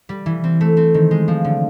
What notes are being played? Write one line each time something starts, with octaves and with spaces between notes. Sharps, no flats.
G3
E3
C4
A3
C4
D#3
G#3
F3
D3